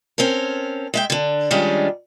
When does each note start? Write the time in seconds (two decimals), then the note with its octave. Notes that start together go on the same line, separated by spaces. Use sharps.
0.18 C4 C#4 A4 A#4
0.94 G#3 E5 G5
1.10 D3 D4
1.51 D#3 G3 G#3 C#4 D4 F4